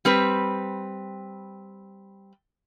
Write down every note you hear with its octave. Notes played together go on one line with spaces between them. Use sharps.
G3 C4 B4